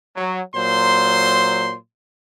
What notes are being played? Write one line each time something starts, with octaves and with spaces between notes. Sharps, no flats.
F#3
A#2 F#3 C5 C6